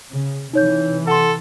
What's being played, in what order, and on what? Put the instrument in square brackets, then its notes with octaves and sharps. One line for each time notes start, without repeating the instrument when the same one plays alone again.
[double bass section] C#3
[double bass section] C3 E3 [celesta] D#4 C#5 G6
[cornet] A4 [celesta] F#5 C6